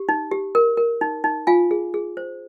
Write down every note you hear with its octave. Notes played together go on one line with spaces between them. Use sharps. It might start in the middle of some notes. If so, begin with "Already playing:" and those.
Already playing: G4
D#4
G4
A#4
A#4
D#4
D#4
F4 F5 G#5
G#4
G#4
C5